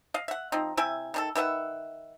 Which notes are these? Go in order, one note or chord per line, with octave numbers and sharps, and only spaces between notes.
D#5 F5
E5 F#5
F3 C4 D#4
C3 E4 E5 G#5
D#3 D4 A4
D#3 B4 E5 F#5